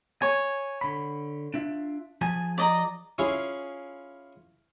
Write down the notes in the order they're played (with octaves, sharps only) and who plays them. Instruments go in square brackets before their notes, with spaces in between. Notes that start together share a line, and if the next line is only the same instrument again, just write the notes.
[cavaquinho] C#5 [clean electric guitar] G#5
[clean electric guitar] D3 B5
D4 F4 E5
[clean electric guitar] F3 G#4 A5 [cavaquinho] G#5
[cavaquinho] D5 D#5 A#5
[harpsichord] C#4 E4 F4 G#4